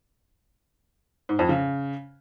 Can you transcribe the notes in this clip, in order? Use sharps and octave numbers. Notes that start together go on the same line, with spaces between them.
G#2
F2
C#3